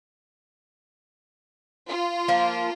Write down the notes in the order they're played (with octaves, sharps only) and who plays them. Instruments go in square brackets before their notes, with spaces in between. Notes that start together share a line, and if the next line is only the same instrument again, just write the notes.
[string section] F4
[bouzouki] F3 A#3